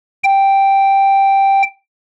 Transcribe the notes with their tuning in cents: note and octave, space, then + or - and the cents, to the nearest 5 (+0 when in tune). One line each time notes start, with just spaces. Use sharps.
G5 +0